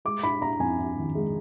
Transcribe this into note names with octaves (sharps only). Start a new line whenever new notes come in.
G#3 D6
D4 B5
D4 A#5
F2 G#5
D4
D#3
G#3